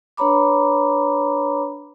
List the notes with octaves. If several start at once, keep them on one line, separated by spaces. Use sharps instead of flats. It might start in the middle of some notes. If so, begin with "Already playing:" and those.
D4 B4 C#5 A#5 B5 D6